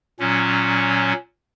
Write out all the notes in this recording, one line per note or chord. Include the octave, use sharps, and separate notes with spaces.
A#2 F#3 C#4